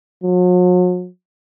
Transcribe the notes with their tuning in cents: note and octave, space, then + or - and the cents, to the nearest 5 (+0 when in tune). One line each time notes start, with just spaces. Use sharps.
F#3 -45